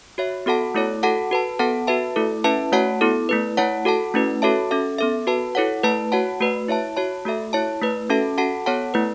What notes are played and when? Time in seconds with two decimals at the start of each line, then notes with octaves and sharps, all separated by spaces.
0.18 F#4 C#5 E5
0.46 B3 F#4 A4 F#5 A5
0.74 A3 E4 A4 C#5
1.03 F#4 A4 F#5 A5
1.31 F#4 B4 A5
1.59 B3 A4 F#5 A5
1.87 F#4 B4 E5 A5
2.16 A3 E4 A4
2.44 C#4 E4 B4 E5 A5
2.72 A3 F#4 C#5 F#5 A5
3.01 B3 E4 A4
3.29 A3 E4 B4
3.57 A3 E4 C#5 F#5 A5
3.85 F#4 A4 F#5 A5
4.14 A3 C#4 E4 B4
4.42 F#4 A4 C#5 E5 A5
4.71 C#4 A4 E5
4.98 B3 A4 E5
5.27 F#4 B4 A5
5.55 E4 A4 C#5 F#5
5.83 A3 E4 B4 A5
6.12 F#4 C#5 F#5 A5
6.40 A3 F#4 B4
6.68 E4 C#5 E5 A5
6.97 F#4 C#5 A5
7.25 A3 F#4 A4 E5
7.53 E4 C#5 A5
7.82 A3 E4 B4
8.10 C#4 F#4 A4 E5 A5
8.38 F#4 A4 F#5 A5
8.66 B3 A4 C#5 F#5 A5
8.94 A3 E4 B4